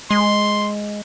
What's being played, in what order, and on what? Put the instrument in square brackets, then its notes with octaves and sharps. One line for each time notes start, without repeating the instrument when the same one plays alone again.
[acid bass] G#3 [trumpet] C6